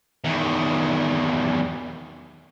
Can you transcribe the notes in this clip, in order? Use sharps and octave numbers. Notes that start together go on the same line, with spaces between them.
E2 D#3